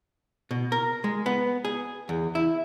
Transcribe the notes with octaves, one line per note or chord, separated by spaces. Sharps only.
B2
A#4
G#3
B3
G#4
E2
E4